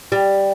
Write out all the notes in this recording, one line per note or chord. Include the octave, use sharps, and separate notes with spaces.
G3